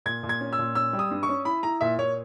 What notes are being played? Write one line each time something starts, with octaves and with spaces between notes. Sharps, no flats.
A#2 G#6
A#2
G#6
C#4
E6
A#2
C#4 E6
G3
D#6
G2
C#6
C#4
E4 B5
E4 A#5
A#2 E5
A#2 C#5